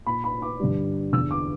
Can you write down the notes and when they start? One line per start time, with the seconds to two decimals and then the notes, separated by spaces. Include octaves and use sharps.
0.06 A#2 B5
0.24 B5
0.42 D6
0.60 G2 D3
1.13 E2 D3 E6
1.31 D6